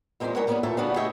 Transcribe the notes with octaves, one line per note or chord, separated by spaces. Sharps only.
E2 A#2 G#3 B3 C4 G4
G3 G#3 B3 A#4 C#5 F#5
D3 G3 A#3 B3 C#4 G#4
E2 A#2 A3 A4 C#5 E5
C#3 G3 A3 B3 D4 F#4
A3 G4 G#4 C#5 D#5 E5